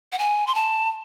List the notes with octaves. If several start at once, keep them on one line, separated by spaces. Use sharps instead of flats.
F#5
G#5
C6
A5